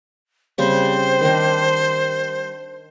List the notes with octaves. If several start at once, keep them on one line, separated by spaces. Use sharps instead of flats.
C#3 G3 C4 C5
D#3 D4